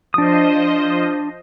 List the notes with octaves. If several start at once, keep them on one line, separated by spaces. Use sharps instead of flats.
F3 D4 C5 D#5 D#6